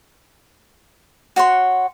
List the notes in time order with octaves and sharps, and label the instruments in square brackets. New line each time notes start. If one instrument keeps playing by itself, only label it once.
[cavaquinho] F#4 C#5 F#5 C6